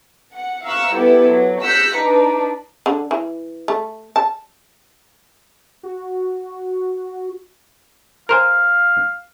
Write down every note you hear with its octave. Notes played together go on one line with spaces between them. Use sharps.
F#5
E5 F5 A#5 C#6 E6 F#6
G3 B3 E4 G4 A4 B4
F#3
E6 F#6 G6 A#6 B6 C#7
D4 D#4 B4
D3
E3
A3
A5
F#4
A#4 C5 F5 G#5